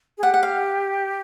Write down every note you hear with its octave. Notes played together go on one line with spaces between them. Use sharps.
G#4
G4 F#5
F#5
F5